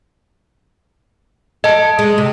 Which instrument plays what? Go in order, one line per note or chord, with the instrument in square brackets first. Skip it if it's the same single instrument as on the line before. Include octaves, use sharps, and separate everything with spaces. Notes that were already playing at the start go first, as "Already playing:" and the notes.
[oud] A4 [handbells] D#5 A5
[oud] G#3
C3